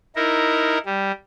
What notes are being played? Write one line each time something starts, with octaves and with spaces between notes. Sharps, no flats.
D#4 E4 A#4
G3